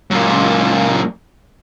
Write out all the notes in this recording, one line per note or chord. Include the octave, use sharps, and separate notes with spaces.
F#2 A#2